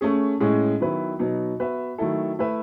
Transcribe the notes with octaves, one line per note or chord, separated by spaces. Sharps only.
A3 C#4 G#4
A2 G#3 C#4 G#4
D#3 F#3 B3 E4 B4
B2 F#3 B3 D#4
B3 F#4 B4 E5
D#3 F#3 A3 E4 A4
A3 E4 B4 E5